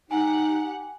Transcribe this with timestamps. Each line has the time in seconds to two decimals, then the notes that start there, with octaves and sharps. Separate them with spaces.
0.11 D#4 G4 F#5 G#5